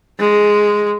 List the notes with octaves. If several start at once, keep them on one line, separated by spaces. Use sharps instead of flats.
G#3